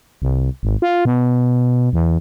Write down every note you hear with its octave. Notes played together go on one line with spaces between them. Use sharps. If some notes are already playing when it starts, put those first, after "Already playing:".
C2
G#1
F4
B2
E2